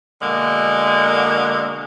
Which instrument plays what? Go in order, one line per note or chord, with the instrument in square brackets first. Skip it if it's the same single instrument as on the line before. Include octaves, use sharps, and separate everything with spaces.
[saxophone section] B2 D3 G#3 A#3